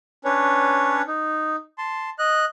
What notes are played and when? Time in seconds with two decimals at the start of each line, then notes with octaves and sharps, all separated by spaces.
0.25 C#4 D4 B4 C#5
1.08 D#4
1.78 A5 C6
2.19 D#5 F#6